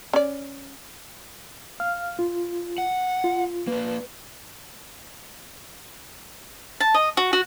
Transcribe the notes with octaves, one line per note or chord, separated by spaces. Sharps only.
C#4 D5
F5 F6
F4
F#5
F4
A#3 D4 B4
A5
D#5
F#4
F#4